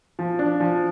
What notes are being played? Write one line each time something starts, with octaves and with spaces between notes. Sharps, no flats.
F3
D4
F3